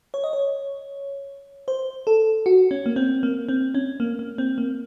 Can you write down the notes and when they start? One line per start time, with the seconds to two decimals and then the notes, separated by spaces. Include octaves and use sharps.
0.14 C#5
0.24 D#5
0.33 C#5
1.68 C5
2.07 A4
2.46 F#4
2.71 C#4
2.86 A#3
2.96 C4
3.23 A#3
3.49 C4
3.75 C#4
4.00 A#3
4.19 A#3
4.38 C4
4.58 A#3